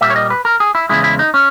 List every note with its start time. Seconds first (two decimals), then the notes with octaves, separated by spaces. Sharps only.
0.01 A#2 G3 A#3 E5
0.10 C#5
0.16 D#5
0.30 B4
0.45 A#4
0.60 G#4
0.75 E4
0.89 E2 C#3 G#3 E4
1.04 E4
1.19 D#4
1.34 C#4